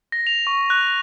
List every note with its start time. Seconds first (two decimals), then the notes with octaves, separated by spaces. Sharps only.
0.12 A#6
0.27 F7
0.47 C#6
0.70 F#6